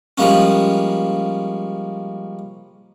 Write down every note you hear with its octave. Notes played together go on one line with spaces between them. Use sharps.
F3 G3 G#3 A#3 C#4